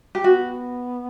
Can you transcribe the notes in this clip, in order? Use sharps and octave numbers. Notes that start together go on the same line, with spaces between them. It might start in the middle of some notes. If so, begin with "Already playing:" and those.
G4
B3 F#4